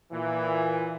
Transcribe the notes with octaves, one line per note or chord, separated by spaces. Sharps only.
A#2 E3